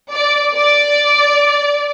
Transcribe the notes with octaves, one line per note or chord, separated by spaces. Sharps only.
D5
D5